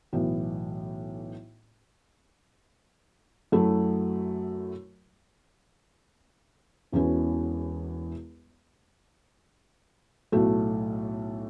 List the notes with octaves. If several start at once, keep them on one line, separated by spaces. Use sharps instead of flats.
B1 A2 E3
F#2 F#3 A3 E4
E1 E2 E3 C#4 F#4
B1 A2 A3 F#4